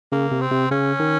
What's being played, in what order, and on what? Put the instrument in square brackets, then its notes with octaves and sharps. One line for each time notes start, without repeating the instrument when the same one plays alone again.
[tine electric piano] C#3 [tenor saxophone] A#3
[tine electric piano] C3
[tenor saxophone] C4
[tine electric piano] C3
[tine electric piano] C#3 [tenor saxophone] C#4
[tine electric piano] D#3